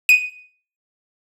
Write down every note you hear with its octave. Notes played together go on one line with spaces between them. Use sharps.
D#7